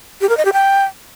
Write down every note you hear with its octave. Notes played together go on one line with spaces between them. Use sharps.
G4
A#4
D#5
G4
G5